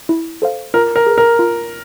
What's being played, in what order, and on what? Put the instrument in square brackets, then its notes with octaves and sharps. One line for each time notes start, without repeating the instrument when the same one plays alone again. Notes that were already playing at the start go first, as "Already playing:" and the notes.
[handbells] E4
A4 C5 F5
[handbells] F4 [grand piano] A#4
[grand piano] A#4
[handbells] G#4 B4
[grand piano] A#4
[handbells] F4